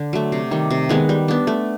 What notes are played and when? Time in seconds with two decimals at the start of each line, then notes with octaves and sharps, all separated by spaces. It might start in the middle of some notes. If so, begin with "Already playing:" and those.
Already playing: D3
0.13 F#3 A3
0.32 C3
0.51 D#3 G3
0.71 C3
0.89 D#3 G#3 B3
1.09 G3
1.28 B3 D4
1.47 A3